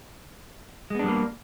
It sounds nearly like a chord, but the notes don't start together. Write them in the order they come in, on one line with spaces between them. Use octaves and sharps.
G#3 B3 D4 G3 A#3